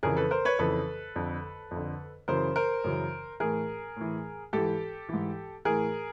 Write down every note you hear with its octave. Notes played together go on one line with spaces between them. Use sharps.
F2 C#3 E3 G#4 A#4
A4 B4
A#4 C5
B4 C#5
F2 C#3 E3 A4 B4
F2 D3
F2
D3
F#2 C#3 E3 A#4 C5
A#4 C5
F#2 C#3 E3
A2 E3 G#4 A#4
A2 E3
G#2 E3 G4 A4
G#2 E3
A2 E3 G#4 A#4